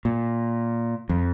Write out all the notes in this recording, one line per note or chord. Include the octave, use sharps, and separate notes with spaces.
A#2
F2